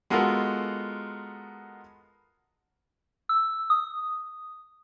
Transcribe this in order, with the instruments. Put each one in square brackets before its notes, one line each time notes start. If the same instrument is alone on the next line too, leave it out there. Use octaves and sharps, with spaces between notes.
[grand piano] G#3 B3 F4 F#4 A4 A#4
[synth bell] E6
D#6